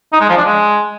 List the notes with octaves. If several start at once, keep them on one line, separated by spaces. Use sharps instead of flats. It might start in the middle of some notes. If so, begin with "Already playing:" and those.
D#4
G#3
F3
D4
G#3